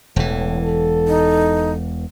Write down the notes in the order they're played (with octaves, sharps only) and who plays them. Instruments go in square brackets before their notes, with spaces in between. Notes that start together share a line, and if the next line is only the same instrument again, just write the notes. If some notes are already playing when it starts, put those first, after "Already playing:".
[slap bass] E1 E3 [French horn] A2
[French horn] A4
[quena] D#4